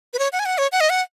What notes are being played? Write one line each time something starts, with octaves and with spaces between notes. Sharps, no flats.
B4
C#5
F#5
G#5
F#5
C#5
F#5
D#5
F#5